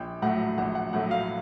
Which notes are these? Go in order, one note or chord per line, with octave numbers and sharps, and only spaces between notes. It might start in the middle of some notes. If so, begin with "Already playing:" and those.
Already playing: A#1 G5
A2 F#3 A3 F#5
A#1 F#5
F#5
A2 F#3 A3 F#5
F5